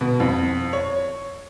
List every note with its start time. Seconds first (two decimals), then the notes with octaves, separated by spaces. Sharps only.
0.01 B2
0.20 F2
0.73 C#5